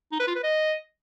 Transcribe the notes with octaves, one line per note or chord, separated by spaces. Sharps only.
D#4
B4
F4
B4
D#5